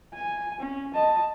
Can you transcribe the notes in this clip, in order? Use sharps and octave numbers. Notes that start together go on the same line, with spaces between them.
G#5
C#4
D#5 A5